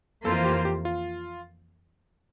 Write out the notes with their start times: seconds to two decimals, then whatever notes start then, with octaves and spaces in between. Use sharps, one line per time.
0.25 F2 E3 A#3 F4 A4 C5
0.45 G4
0.65 G4
0.85 F4